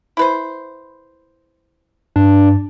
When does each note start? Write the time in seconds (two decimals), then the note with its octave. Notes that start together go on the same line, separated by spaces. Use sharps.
0.17 E4 B4 C5
2.16 G2 D4